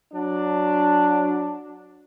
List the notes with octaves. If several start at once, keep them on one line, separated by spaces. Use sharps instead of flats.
F#3 D4